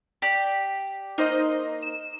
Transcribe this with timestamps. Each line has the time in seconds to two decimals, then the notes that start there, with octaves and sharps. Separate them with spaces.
0.22 G4 D5
1.18 A#3 D#4 C5 D#5
1.82 E7